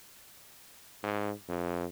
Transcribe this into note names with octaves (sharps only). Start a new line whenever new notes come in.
G#2
F2